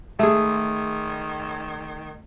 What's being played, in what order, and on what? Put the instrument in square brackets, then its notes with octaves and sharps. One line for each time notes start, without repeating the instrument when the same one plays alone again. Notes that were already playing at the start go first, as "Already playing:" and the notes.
[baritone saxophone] D#3 [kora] A3 G#4